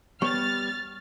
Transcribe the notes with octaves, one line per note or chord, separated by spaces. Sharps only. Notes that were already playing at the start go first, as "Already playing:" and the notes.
G3 B3 C#5 C#6 F6 A6